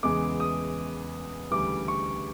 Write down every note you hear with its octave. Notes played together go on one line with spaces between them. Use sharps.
E2 C#3 E3 G#3 B3 D6
D#6
D2 C#3 E3 G3 D6
C#6